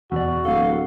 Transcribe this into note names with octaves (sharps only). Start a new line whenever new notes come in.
E2 B2 F#4 D5
D1 A4 F5